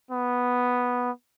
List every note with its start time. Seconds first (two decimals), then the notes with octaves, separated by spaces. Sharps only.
0.11 B3